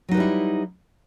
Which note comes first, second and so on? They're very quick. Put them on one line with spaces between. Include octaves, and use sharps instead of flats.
F#3 D#4 B4 G3 E4